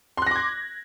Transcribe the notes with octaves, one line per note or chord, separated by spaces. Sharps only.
C6 D6 F#6 G#6 A#6